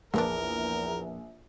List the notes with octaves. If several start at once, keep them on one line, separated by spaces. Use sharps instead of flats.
A#1 E2 G#3 A#3 D4 A#4